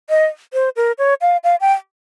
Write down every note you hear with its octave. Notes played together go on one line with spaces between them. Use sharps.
D#5
C5
A#4
C#5
F5
F5
G5